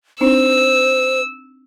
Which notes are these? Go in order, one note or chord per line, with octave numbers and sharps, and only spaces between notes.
C4 D4 D#4 C5 E6